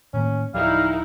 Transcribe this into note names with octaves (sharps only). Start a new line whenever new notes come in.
A2 D#3 A#3 C#4
D1 F3 G3 D#4 E4 A#4 F5